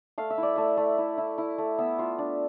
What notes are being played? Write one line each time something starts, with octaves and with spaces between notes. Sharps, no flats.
A3 F5
E5
E4 D5
A3 E5
A3
E4
E4
E4
A3
B3 E5
F4
D4